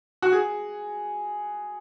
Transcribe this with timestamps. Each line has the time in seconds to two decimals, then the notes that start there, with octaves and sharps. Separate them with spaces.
0.22 F#4
0.32 G#4